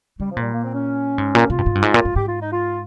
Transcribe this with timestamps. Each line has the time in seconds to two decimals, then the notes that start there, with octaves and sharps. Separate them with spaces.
0.20 C#3 G3
0.31 F3
0.37 A#2
0.42 G3
0.53 A#3
0.63 C4
0.74 C#4
1.18 G#2
1.35 A#2
1.50 C3 F4
1.58 G2
1.66 G#2
1.75 G2
1.82 G#2
1.94 A#2
2.05 G#2
2.16 G#2 G4
2.28 F4
2.40 D#4
2.53 F4